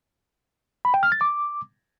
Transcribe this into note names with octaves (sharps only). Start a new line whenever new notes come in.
B5
G5
F6
A6
D6